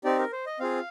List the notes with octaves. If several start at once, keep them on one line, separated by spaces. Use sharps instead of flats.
C4 D#4 G4 D5
A#4
C5
D#5
C4 F4 G#4 F5